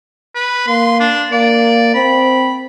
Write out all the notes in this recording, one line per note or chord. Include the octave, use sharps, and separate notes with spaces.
B4
A#3 C6
D4
A#3 D5
C4 B5